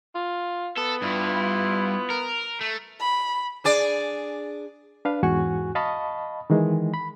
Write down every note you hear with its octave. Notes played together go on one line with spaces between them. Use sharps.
F4
B3 A4
G2 E4 F4
A#4
A3
B5
D4 G#4 D5
D4 B4 F5
E2 G#2 F#4 G#5 C#6 F#6
D#5 F5 A5 B5 C#6 D#6
D#3 E3 G#3
B5